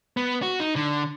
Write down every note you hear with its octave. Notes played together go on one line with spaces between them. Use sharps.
B3
F#4
D#4
D3